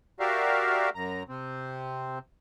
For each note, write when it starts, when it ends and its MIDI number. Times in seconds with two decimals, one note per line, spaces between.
0.20 0.90 66
0.20 0.90 67
0.20 0.90 70
0.20 0.90 74
0.20 0.90 76
0.20 0.90 77
0.95 1.23 42
0.95 1.23 82
1.29 2.19 48
1.29 2.19 60